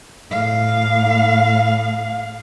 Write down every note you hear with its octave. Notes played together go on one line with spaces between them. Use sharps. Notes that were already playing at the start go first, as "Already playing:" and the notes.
A2 F5